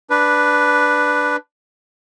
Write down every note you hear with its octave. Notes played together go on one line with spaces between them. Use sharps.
D4 B4